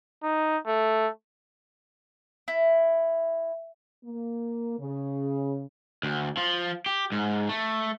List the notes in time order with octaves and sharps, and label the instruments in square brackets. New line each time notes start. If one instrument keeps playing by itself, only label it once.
[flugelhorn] D#4
A3
[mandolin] E4
[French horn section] A#3
C#3
[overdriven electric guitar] D2
F3
G4
G#2
A3